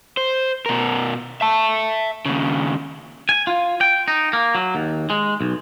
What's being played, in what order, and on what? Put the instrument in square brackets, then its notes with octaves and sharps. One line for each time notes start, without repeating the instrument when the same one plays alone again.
[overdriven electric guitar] C5
B2 A#4
E5 A5
D#2 C#3
[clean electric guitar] G#5
F4
G5
D#4
A#3
F#3
D#2
G#3
B1